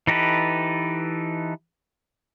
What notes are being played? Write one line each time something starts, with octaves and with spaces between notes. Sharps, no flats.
E3 D#4 G4 A4 B4